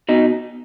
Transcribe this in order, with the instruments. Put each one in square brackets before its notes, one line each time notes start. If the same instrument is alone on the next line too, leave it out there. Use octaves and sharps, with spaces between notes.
[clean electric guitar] B2 D#4